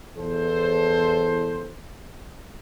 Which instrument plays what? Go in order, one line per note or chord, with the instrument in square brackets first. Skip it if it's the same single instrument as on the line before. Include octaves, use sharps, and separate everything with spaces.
[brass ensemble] E2 A4 C5